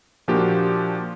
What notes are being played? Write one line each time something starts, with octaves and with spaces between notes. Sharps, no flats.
A#2 F3 A#3 D4 F#4 G4